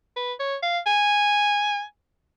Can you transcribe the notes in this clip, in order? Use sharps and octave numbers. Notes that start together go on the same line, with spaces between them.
B4
C#5
F5
G#5